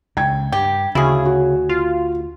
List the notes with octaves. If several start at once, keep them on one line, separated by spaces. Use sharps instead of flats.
C#2 C#3 G5 G#6
G2 G4
D2 C#3 E4 F#4 G#4
F#4
F4